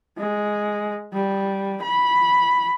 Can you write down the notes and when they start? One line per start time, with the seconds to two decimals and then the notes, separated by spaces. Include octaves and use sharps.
0.18 G#3
1.13 G3
1.82 B5